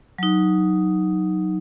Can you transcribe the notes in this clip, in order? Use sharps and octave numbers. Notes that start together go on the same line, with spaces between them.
F#3 D#4